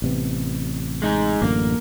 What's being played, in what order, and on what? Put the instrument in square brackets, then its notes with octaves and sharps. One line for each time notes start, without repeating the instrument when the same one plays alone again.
[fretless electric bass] A1 C3 B3
[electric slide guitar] G#3 D#4 G#4
[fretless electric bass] A1 F#2 D3 [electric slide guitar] A#3